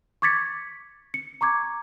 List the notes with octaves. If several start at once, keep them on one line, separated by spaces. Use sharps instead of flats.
C#6 D6 G#6 A6 B6 C#7
C#7
A#5 C#6 D6 G#6